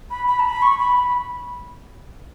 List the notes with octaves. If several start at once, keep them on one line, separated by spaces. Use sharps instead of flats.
B5
B5
A5
B5
C#6
B5
B5